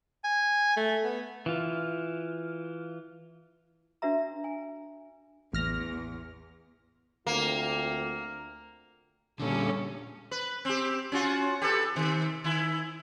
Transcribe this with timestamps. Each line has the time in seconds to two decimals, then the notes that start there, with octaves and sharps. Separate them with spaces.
0.24 G#5
0.76 A3
1.04 B3
1.46 E3 F4
4.02 D4 F#4 B4 E5 A#5
4.44 G#5
5.53 A1 E2 F6 A#6
7.27 D2 A#3 C4 F4
9.40 A#2 D3 G3 C#4 A4
10.31 B4
10.65 C4 G4
11.12 C#4 F4 F#4
11.62 G4 A4 B4
11.95 C3 D#3
12.44 D#3 E4